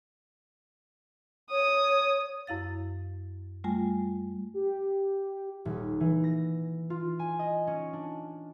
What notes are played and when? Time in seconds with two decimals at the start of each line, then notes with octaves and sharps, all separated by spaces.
1.51 C#5 D#6
2.47 F#2 E4 F5 A6
3.64 G3 A3 F4 G#5
4.54 G4
5.65 D#1
6.00 E3
6.24 A#6
6.90 F4
7.19 G#5
7.39 D#5
7.67 C#4
7.93 D4